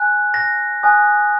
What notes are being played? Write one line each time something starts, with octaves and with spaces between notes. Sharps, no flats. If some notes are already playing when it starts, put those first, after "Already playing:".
Already playing: G#5 F#6
A#6
G#5 D#6 F#6